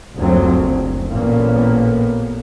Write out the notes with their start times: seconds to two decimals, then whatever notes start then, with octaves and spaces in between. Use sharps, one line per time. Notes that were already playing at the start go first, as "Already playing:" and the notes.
0.17 F#1 D2 F3 F#3 C4
0.57 F#1
1.10 A1 A#2 A#3 B3